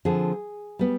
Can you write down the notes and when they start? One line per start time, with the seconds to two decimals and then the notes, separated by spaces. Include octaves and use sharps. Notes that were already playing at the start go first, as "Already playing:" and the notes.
0.05 D3 F3 C4 G#4
0.79 G3 B3